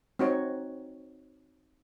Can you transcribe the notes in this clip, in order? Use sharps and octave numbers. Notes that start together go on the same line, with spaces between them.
C4 D#4 F#4 C5 C#5